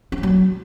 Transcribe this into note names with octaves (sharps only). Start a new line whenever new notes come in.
C4
D4
F#3